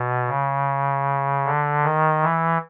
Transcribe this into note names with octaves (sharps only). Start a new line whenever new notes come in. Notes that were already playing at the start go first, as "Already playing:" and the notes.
Already playing: B2
C#3
D3
D#3
E3